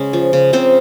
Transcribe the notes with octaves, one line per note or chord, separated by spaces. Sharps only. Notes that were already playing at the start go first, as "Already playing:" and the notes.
Already playing: C#3 G#3 C#4
F3
C#3
C#3 C4 C5